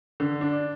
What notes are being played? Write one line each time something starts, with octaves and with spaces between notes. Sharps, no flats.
D3
D4